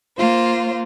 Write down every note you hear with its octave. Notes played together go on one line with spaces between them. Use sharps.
A#3 F4 C5